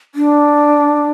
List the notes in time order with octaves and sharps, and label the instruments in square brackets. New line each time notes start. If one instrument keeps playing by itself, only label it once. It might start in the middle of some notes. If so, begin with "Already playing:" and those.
[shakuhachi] D4